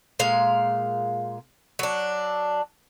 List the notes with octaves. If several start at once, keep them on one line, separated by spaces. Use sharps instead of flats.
A#2 G#3 F5
F#3 D4